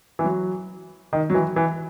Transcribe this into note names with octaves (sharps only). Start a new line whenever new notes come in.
E3
F#3
D#3
F#3
E3
E3